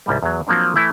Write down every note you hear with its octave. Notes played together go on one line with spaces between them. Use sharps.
C2 G#2 G3
E2 F#3
F3 F#3 A#3 C4 D4
E3 A3 E4